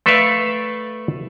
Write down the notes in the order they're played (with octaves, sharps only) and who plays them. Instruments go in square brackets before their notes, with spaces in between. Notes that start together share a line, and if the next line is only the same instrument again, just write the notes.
[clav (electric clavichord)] A3 A4 B4 D5 E5 F5